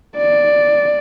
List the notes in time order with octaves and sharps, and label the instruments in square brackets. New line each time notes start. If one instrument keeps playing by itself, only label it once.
[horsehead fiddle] D5